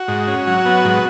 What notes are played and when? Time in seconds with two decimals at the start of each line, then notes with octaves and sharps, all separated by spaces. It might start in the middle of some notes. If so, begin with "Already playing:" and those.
Already playing: F#4
0.08 G#2
0.27 C#4
0.47 F#3
0.66 B3
0.85 G#2